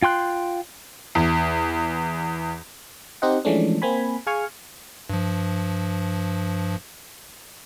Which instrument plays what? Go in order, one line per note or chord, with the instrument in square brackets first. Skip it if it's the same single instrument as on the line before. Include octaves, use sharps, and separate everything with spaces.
[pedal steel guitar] F4 G5 C6 F#6
[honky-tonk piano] E2
[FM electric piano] C4 D#4 G4 C5 D#5 F#5
E3 F3 G#3 A3 C#4 D4
A#3 C4 G#5 B5
G#4 F5 G#5 C#6 F6
[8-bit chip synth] G2 F3